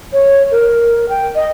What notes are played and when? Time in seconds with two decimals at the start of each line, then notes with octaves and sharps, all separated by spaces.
0.13 C#5
0.51 A#4
1.09 G5
1.35 D#5